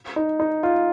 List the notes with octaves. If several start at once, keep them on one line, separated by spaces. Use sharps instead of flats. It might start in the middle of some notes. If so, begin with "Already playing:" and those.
D#4
D#4
F4